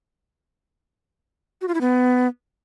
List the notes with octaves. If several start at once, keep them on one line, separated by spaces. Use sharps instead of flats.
F#4
F4
E4
B3